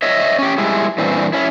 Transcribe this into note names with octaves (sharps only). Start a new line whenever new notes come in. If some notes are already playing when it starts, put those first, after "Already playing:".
C#5 D#5 E5
C#4 G4
G3 G#3 E4
G2 A#2 E3 C4
C#4 E4